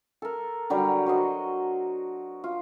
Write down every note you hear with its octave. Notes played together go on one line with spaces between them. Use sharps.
A4 A#4
D3 F#3 G3
F#4 C5 D#5
F4